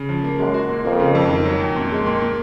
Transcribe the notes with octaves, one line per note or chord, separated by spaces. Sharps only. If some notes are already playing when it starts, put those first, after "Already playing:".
Already playing: C#3
F3
A#3
F#2 G#3
F#4
A#2
F2 A#3
C#3
F2
D#3
F#3
F2
F#2 A#2
G#3
A#2
A#2